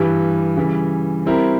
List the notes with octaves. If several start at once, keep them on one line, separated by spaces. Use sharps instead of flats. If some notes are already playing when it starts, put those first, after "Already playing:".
Already playing: G2 E3 G3
C#3 E3 G3
G3 C4 E4 G4 A#4